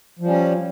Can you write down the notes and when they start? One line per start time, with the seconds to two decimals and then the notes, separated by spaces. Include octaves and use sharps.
0.19 F3
0.23 G3
0.27 C#4